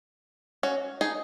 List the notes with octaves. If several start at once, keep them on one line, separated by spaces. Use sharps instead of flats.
C#4 F#4
D#4 G#4